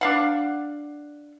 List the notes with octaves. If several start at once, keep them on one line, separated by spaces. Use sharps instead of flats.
D4 F5 F#5